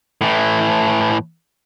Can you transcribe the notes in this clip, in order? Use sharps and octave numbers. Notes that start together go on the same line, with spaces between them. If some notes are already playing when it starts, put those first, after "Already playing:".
A2 E3